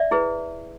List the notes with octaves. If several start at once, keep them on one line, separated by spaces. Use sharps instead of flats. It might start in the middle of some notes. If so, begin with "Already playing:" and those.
Already playing: D5 E5
E4 G#4 B4